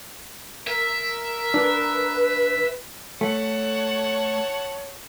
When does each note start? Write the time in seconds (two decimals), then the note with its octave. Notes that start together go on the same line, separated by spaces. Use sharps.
0.67 A#4 E5
1.54 D4 B4
3.21 A3 C#5 F#5 A5